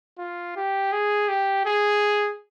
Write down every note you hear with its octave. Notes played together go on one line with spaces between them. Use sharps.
F4
G4
G#4
G4
G#4